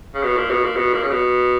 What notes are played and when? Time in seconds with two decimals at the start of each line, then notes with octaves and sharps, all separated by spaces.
0.14 C#3
0.23 B2
0.37 A#2
0.50 B2
0.64 A#2
0.76 B2
0.94 A#2
1.03 C#3
1.11 B2